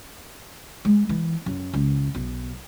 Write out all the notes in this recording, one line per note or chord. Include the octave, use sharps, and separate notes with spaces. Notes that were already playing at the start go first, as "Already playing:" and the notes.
G#3
E3
F#2
C#2
B1